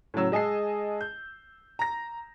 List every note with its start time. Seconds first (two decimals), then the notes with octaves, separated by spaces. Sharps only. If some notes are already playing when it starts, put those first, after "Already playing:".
0.14 A2 C#3 F#3 E6
0.32 G#3 D#5 G#5 A5 C7
1.01 G6
1.79 A#5 A#6